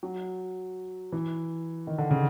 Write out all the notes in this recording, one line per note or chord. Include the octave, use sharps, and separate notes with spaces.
F#3
E3
D#3
D3
C#3